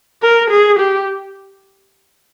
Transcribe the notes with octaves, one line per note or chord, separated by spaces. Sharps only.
A#4
G#4
G4